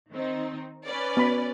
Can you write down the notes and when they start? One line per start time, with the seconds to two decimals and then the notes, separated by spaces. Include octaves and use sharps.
0.10 D#3 C4 D#4
0.85 C#4 B4 D5
1.17 B3 B5